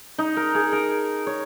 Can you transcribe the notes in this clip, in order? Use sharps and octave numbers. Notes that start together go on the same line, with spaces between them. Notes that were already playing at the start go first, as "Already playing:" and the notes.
D#4
A#4
G#4
A#4
C#5